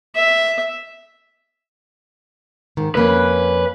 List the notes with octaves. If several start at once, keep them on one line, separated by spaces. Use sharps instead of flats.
E5
G#2 D#3
F2 A#3 C#4 B4